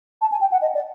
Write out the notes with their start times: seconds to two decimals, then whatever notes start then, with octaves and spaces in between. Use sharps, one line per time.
0.21 A5
0.31 G#5
0.41 G5
0.51 F#5
0.61 D#5
0.74 D5